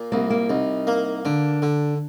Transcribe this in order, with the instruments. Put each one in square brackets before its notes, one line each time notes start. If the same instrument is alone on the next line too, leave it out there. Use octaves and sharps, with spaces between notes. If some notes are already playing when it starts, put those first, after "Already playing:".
Already playing: [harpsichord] A#2
[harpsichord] C2 [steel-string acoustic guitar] A#3
[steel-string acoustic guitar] A#3
[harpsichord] C2 [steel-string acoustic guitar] D#4
[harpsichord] A#3
[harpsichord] D3 [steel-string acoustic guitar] D4
[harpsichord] D3